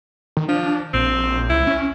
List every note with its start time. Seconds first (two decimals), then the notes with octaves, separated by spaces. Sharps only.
0.37 D#3
0.49 F3 D4
0.94 A#1 C4
1.50 C#2 E4
1.67 C#4